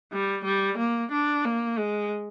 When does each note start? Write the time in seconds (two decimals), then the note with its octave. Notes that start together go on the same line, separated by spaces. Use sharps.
0.13 G3
0.45 G3
0.78 A#3
1.12 D4
1.45 A#3
1.78 G#3